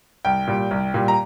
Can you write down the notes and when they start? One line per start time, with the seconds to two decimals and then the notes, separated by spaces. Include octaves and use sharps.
0.25 C2 G5
0.47 A#2 G3
0.71 C2
0.94 A#2 G3
1.08 A#5